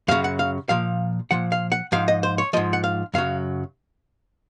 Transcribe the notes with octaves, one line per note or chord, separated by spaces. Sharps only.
F#2 C#3 F#3 F5
F#5
F5
A#2 F3 F5
A#2 F3 F#5
F5
F#5
G#2 F3 F5
D#5
C5
C#5
G#2 F3 D#5
F#5
F5
F#2 C#3 F#3 F5